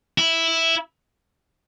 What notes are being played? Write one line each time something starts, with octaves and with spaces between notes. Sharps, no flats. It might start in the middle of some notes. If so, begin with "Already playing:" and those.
E4